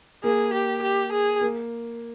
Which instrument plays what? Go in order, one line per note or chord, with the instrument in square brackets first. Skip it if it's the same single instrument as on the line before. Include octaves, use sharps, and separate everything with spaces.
[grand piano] A#3 [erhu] G#4
[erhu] G4
G4
G#4
[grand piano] A#3